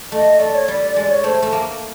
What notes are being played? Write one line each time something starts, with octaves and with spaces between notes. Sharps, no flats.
A3 D#5
A3 D5
C#5
G3 D5
D5
G#3 D5
C#5
A3 C5
A3
A#3